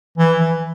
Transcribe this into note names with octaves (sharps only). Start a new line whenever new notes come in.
E3
E3